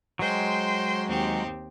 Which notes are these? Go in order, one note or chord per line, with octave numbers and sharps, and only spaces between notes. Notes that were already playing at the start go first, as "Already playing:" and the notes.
F#3 G#3 C5 G5 C6
D#2 C4 G4